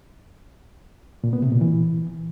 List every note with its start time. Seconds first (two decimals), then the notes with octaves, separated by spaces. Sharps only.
1.24 A#2
1.33 B3
1.42 C3
1.52 A#2
1.61 E3